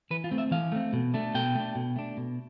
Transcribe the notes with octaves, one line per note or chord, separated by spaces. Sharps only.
E3 B4
F4
A3 C4
E5
E3 F5
A3 C4
B2
A3 D4
B2 G5
A3 D4
B2
A3 D4
B2